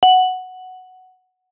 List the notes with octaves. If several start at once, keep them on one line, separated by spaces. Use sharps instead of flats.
F#5